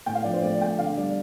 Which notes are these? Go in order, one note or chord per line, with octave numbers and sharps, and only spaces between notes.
A2 G5
F5
F3 D5
C5
A3 D5
A3 G5
D3 F5
G3 D5